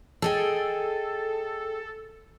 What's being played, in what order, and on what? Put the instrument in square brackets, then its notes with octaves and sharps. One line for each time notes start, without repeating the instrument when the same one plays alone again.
[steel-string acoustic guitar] G#4 D#5 G5 [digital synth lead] A4